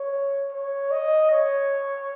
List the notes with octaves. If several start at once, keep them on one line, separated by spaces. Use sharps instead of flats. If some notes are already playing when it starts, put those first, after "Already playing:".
Already playing: C#5
C#5
D#5
C#5